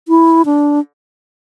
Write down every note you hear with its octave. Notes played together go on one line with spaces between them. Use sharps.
E4
D4